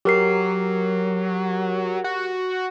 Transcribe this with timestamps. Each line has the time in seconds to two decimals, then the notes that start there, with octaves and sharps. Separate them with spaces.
0.05 F#3 G4 A#4 C7
2.04 F#4